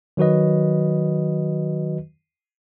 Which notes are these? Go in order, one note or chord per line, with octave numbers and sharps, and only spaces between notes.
D#3 F#3 F#4 B4 D#5